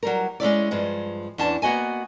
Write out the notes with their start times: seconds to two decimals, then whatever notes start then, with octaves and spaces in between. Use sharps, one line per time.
0.03 F#3 G3 A#4
0.40 G#3 C#4 E4 D5
0.71 G2 F3 G#3
1.38 E2 C#4 D4 A5
1.62 A#3 B3 F#4 D#5 G#5